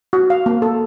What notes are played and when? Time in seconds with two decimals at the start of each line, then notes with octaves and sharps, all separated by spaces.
0.13 F#4
0.30 F5
0.46 A#3
0.62 A4